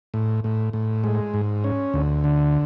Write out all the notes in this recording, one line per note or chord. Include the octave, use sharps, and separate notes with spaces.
A2
A2
A2
G#3
G#2
C#4
D2
D3